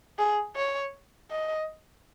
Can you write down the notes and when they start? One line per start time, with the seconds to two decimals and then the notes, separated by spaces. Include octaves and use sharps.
0.19 G#4
0.56 C#5
1.31 D#5